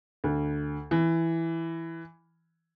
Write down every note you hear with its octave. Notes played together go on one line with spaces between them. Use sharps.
D2
E3